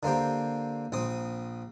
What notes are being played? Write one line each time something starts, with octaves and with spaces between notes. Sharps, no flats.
D3 A#3 C4 G4
A#1 C4 D#6